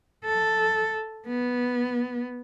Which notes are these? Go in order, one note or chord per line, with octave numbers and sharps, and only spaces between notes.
A4
B3